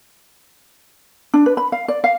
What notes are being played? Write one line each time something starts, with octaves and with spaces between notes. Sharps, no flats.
D4
B4
B5
F5
D5
F5